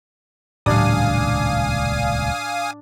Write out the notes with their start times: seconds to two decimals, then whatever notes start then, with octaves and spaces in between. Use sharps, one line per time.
0.66 D#1 C#2 A2 F#3 D4 F5 G#5 D#6